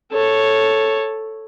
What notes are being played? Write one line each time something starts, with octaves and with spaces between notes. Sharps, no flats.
A4 C#5